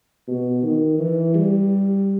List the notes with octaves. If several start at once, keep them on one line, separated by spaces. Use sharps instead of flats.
B2
D#3
E3
G3